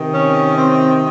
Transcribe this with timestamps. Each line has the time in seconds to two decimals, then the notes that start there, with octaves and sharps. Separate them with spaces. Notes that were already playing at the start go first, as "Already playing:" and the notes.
Already playing: C3 D#3
0.12 C#4
0.57 C4